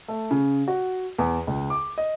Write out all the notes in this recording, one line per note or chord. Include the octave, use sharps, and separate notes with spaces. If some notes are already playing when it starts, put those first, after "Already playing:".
A3
C#3
F#4
E2
C#2
D6
D#5